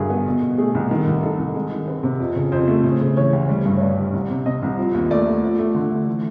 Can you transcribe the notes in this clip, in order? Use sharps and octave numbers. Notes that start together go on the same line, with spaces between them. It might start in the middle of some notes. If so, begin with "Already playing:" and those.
Already playing: G2 D3 F#3 G#4 A#4
B3
B2
B2
A3 G#4
C2
D#3
C2
D#3 A4
C2
G#3
D#3
C4 B4
C3
F2
C#3
F2 C5
A3
C#3
C#3
E3 C#5
D2
G3
G2
C#5
G2 D5
G3
C2
C3
C3 D#5
C2
F3
D#2
A3 D5
A3
F3
A3
D3
A3
E3